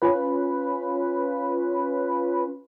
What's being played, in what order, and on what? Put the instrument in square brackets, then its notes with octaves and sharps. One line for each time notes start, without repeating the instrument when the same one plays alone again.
[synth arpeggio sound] C#4 F4 B4